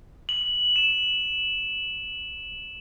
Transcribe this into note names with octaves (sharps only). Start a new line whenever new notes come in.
F#7
E7